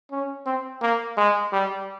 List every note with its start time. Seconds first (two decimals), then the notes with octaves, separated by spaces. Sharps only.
0.11 C#4
0.46 C4
0.82 A#3
1.17 G#3
1.53 G3